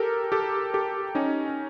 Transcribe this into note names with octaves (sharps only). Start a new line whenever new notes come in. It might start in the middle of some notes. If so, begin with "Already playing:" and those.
Already playing: G4 A4 A#4
G4 A4
G4 A4
C#4 D#4